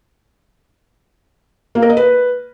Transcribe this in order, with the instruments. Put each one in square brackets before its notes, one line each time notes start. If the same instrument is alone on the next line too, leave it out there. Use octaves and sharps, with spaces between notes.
[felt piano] A#3
A#4
D#5
B4